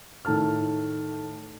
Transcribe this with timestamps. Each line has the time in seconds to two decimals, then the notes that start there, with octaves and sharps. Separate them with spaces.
0.25 A2 D#3 A3 A5 F6